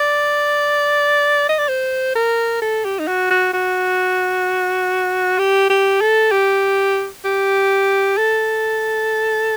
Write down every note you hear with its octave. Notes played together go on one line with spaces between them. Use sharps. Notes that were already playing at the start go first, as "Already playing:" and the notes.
Already playing: D5
D#5
D5
C5
A#4
A4
G4
D#4
F#4
F#4
F#4
G4
G4
A4
G4
G4
A4